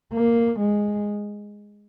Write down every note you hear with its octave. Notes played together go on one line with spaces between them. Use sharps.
A#3
G#3